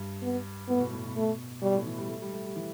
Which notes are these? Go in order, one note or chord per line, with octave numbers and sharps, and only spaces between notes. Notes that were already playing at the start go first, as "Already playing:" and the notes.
Already playing: G2
B3
A2 B3
B2
A2
B2
A3
B2 G3
A2
E3
G3
A3
G3
A3
G3
E3